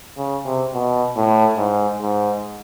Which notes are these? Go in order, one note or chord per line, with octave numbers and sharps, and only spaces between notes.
C#3
C3
B2
A2
G#2
G#2